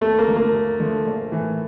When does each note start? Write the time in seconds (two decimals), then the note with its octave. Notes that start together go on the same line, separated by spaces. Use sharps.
0.01 D#2 A3
0.19 A#3
0.28 D3 F3 A3
0.36 A#3
0.54 D#2
0.80 D3 F3 A3
1.07 A#1
1.32 A2 E3